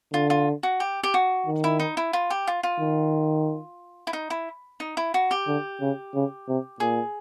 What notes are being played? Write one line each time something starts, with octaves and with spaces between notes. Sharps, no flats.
D3 F4
F4
F#4
G4
G4
F#4
D#3
E4
D#4
E4
F4
G4
F4
F4
D#3
E4
D#4
E4
D#4
E4
F#4
G4
D3
C#3
C#3
C3
A#2 G#4